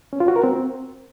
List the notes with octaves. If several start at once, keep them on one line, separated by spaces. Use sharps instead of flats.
C#4
F4
F#4
A#4
C4